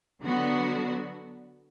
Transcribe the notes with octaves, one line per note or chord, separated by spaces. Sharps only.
D3 F#3 B3 F#4